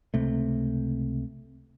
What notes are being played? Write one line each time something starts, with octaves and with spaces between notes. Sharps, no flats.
C#2 C3 A3